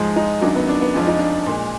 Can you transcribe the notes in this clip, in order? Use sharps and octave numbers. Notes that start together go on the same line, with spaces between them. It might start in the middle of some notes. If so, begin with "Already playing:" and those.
Already playing: G#2 F3 G#3
D#4
F#2 D#3 F#3 D4
B3
D4
B3
F2 F3 G#3 D4
D#4
D4
A#2 G#3